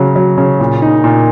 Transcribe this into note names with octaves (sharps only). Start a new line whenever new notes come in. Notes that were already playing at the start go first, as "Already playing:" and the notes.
Already playing: C#3 F#3
F#3
C#3
A#2
D#4
A#2